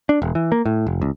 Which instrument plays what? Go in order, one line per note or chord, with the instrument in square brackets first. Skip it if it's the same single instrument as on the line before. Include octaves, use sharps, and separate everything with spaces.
[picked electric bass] D4
E1
E3
A#3
A2
F1
C#2